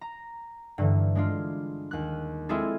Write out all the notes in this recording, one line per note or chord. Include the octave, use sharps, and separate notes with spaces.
A#5
G2 D3 E3
G#3 D4 F4
D#2 F#6
G#3 C4 E4 F4 G#4 A4